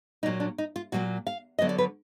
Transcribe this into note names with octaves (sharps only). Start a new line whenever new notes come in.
A#2 F#3 A#3 D#4
D4
D#4
F4
A#2 F#3 A#3 F#4
F5
D3 F#3 B3 D#5
D5
B4